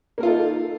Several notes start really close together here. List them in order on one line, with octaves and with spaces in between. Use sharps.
A#3 A#4 F4 A4 D#4